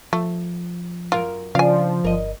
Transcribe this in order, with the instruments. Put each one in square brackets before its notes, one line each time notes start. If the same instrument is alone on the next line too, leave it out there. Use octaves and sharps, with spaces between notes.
[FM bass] F3 [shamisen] A3
[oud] F#2 A#4 [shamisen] F4
[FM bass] C#3 [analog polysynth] F3 [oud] D4 [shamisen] F5 G#5
[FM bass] G1 [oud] A#4 D#5